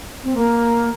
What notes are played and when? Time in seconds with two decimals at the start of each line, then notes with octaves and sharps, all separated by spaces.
0.24 C4
0.34 A#3